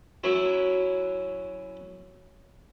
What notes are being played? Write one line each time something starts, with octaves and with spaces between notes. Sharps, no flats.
F#2 F#3 E4